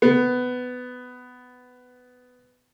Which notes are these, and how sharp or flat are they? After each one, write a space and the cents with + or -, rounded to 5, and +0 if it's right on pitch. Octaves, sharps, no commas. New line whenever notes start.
B3 +15